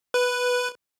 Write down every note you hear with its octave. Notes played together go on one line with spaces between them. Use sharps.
B4